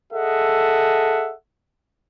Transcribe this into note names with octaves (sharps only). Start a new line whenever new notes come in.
G#4 A4 D#5 E5 F#5